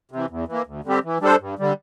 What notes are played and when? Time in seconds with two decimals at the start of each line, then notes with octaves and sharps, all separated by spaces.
0.11 C3 E3
0.30 E2
0.48 E3 A#3
0.66 D2
0.84 D3 G3 C4 G4
1.04 E3
1.21 G3 D4 A4 C5
1.40 G2
1.59 D3 G3